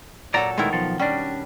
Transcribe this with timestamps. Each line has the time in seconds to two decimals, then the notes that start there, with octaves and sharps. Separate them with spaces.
0.34 A#2 F#3 A4 D5 A#5
0.58 B2 D#3 G#3 A3 E4 A#4
0.73 B1 F3 A4
1.00 G3 C#4 D4